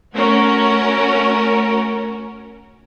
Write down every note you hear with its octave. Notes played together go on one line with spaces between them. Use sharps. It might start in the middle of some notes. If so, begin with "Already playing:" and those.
A3 C#4 F#4 A#4